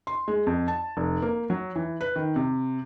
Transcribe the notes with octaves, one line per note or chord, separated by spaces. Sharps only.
C6
G#3
F2
A5
F1
A#3
F#3
E3
B4
D#3
C3